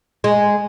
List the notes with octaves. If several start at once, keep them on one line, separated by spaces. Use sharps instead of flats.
G#3